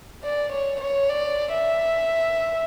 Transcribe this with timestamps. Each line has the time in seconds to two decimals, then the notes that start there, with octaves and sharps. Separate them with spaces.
0.24 D5
0.52 C#5
0.81 C#5
1.10 D5
1.53 E5